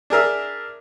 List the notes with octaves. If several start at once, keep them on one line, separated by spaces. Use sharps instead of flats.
D4 G#4 A#4 E5